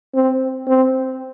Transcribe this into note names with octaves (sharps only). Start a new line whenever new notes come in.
C4
C4